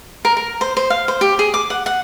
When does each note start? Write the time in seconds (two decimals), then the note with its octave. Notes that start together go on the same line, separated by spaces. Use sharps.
0.25 A#4
0.37 A#4
0.61 C5
0.77 C5
0.90 F5
1.08 C5
1.21 G4
1.39 G#4
1.54 D6
1.70 F#5
1.86 F#5